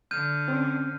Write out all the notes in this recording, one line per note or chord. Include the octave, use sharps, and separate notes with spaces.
D3 F6 G6 D#7
C4 C#4